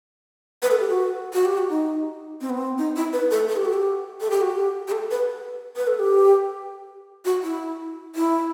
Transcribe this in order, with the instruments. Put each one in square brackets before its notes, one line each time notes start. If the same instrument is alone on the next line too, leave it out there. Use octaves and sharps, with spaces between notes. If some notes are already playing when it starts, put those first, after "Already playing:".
[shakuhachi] B4
A4
G4
F#4
F#4
G4
F#4
D#4
C4
B3
C4
D#4
E4
B4
A4
A4
G4
F#4
G4
A4
G4
F#4
G4
G4
A4
B4
B4
A4
G4
F#4
E4
E4